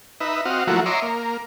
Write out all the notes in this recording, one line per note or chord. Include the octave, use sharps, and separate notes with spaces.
D#4 B4 E5
C4 F#4 D#5 F5
F3 F#3 A3 A#3 E4 F#4
C#5 D#5 E5 A#5 C6 D6
A#3